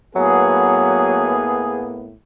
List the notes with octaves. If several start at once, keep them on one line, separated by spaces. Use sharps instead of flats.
A2 F#3 A#3 B3 G#4